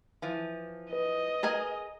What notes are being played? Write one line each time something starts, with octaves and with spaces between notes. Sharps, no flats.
E3 F3
B4 D#5
G#4 A#4 G#5